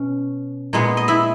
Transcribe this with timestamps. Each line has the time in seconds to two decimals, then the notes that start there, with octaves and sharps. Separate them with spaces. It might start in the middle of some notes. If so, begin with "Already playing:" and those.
Already playing: B2 C#4
0.73 A#2 G#3 B3
0.97 D#5
1.08 E4 E5